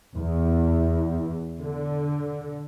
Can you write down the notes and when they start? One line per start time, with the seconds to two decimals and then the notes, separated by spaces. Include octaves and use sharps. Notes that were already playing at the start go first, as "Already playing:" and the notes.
0.18 E2
1.62 D3